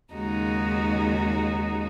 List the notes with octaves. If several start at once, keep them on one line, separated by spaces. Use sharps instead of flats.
D#2 C#3 G#3 D#4 F#4